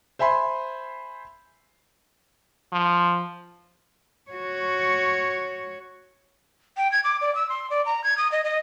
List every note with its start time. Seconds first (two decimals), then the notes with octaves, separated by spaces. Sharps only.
0.19 C5 E5 G#5 B5 C6
2.72 F3
4.31 F#4 C#5
6.77 G5
6.92 G#6
7.04 D6
7.21 D5
7.35 E6
7.49 C6
7.70 D5
7.86 A#5
8.04 G#6
8.18 D#6
8.32 D#5
8.44 D#5